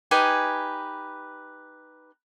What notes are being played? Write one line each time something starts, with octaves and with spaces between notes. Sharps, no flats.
D#4 G4 B4 G#5